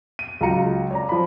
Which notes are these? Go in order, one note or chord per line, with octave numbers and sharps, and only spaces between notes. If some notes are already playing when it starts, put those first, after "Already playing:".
D#7
C#2 F#3 F4 F5 A#5 C#7
C#5 D5 A#5
F3 B5